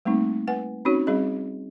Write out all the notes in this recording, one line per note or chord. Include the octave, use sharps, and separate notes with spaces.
G3 A3 A#3 C4 D#4
B4 F#5 G#5
C4 C#4 D#4 F#4 C#5
G3 C4 C#4 G#4 D#5